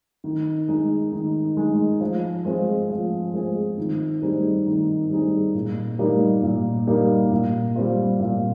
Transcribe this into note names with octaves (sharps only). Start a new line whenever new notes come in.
D#3
G#3 D#4
D#3
G#3 D#4
F3
G#3 C4 F4 G#4
F3
G#3 C4 F4 G#4
D#3
G3 C4 D#4 G#4
D#3
G3 C4 D#4 G#4
A#2
G3 A#3 D#4
A#2
G3 A#3 D#4
A#2
G3 C4 F4
A#2